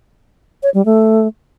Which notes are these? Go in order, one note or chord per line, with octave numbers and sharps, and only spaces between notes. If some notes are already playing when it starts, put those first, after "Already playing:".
C#5
G3
A3